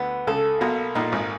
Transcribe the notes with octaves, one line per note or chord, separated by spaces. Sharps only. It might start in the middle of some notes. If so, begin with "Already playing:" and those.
Already playing: D2 D3 B3
C#2 C#3 A4
B1 B2 A#3
A#1 A#2 D#4
G#1 G#2